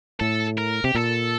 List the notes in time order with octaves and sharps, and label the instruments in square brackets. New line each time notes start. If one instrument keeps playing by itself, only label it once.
[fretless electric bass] A2 [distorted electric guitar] A4
[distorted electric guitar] A#4
[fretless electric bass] C3 [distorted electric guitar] G4
[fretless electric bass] A#2 [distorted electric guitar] A4